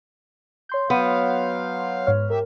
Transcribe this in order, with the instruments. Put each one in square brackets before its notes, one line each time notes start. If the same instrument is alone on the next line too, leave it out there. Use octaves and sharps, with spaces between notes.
[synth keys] C#5 C6 G6
[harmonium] F#3 F5 [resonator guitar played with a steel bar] B3
[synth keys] G#2 C#5 F6
[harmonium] G4 E5 [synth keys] A#4